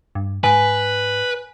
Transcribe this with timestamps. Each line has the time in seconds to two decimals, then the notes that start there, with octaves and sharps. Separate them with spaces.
0.15 G2
0.44 G#2 B4 G#5